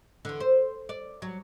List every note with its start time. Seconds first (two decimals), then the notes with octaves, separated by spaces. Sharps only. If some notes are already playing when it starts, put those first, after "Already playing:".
0.25 E2 D3
0.40 C5
0.89 D5
1.22 F#3